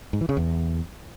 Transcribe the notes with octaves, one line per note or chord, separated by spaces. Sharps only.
G#2
E3
C#3
E2